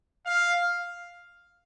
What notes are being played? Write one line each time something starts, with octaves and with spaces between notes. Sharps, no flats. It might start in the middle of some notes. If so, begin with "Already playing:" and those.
F5